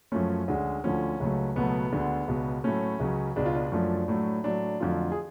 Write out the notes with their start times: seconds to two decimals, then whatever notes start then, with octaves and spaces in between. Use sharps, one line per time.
0.12 F#2 F3 A3 C#4
0.48 D2 D3 G#3
0.84 D2 D3 F3 A3 C#4
1.20 C#2 C#3 F#3 A3
1.56 C#2 B2 F#3 A3 B3
1.92 D2 D3 G#3
2.28 C#2 B2 G#3
2.64 A2 F#3 A3 C#4
3.00 C#2 C#3 F#3
3.36 C#2 B2 G#3 D4
3.46 F4
3.55 D4
3.72 F#2 F3 A3 D4
4.08 A2 F#3 A3
4.44 A2 F#3 A3 D4
4.80 F2 D3 F#3 A3 F4
5.12 G#4